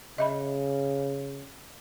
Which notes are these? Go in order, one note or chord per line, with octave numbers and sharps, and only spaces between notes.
C#3 D#5 E5 B5